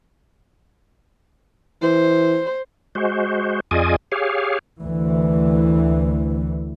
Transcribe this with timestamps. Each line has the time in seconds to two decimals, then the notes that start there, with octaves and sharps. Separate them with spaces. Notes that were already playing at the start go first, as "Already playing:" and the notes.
1.82 E3 C5
2.95 G#3 F#4 C5
3.71 F2 F4 G#4 D5 D#5 G#5
4.12 G4 G#4 C#5 F5
4.82 D2 E3